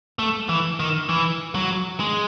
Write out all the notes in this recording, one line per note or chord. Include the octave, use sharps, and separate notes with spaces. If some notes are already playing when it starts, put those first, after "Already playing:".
A3
E3
D#3
E3
F#3
G#3